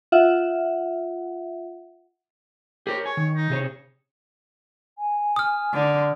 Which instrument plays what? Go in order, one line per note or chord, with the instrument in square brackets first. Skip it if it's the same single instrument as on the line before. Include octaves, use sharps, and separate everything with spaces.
[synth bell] F4 E5 F#5
[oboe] G4 [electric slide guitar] G#4 A#4 C#5
[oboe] C#5 [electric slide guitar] G#5
[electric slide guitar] D#3
[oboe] D#4
[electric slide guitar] C3 G#4 C#5
[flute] G#5
[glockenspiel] D#6 F6
[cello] D3